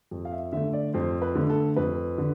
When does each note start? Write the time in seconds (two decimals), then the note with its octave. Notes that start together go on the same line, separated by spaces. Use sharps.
0.11 F2
0.25 F5
0.32 E5
0.53 D3 A3 E5
0.73 D5
0.94 F2 C5
1.22 B4
1.35 D3 A3
1.50 A4
1.76 F2 B4
2.18 D3